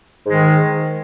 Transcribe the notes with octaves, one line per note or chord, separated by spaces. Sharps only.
G#2 D#3 G#3